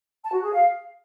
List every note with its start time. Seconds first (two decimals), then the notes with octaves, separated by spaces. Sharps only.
0.24 A5
0.33 F#4
0.43 G#4
0.52 F5